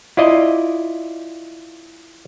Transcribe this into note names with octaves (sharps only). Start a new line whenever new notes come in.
E4 F4 D5 D#5